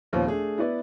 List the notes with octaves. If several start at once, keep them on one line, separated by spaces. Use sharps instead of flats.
D#2 A#2 F3 B3 C#4
A3 D4 G#4
B3 E4 B4 D5